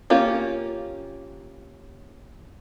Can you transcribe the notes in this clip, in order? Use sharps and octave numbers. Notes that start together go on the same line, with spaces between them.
A#3 C#4 F4 G4